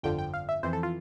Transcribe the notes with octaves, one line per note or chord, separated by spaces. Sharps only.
G1 F2 D3 F3 G5
G5
F5
E5
F2 E3 C5
A4
F4